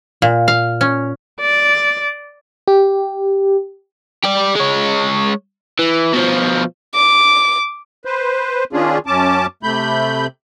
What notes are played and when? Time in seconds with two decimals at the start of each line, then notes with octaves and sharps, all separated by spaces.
0.22 A#2
0.48 F5
0.81 C#4
1.41 D5
2.68 G4
4.24 G4 D5
4.56 G#3 C#5
5.79 E3
6.14 B2 F3
6.94 D6
8.05 B4 C5
8.73 D#3 C#4 D4 F4 G#4
9.07 F#2 C#4 A5 D6
9.63 C3 A3 B5 G6